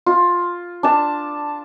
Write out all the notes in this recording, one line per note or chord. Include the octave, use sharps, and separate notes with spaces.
F4
D4 A5